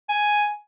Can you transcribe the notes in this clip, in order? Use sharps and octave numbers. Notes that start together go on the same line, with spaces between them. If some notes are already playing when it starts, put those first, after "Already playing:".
G#5